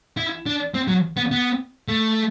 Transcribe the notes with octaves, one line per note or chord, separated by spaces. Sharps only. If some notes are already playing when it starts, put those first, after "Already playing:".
E4
D4
C4
F#3
B3
B3
A3